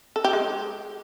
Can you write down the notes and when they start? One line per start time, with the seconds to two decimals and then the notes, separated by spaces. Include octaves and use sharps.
0.16 A4
0.25 G4
0.33 G#3